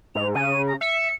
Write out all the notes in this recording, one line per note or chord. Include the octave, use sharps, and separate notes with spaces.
G#2 F7
C#3 D#7
A#5
E5 C#7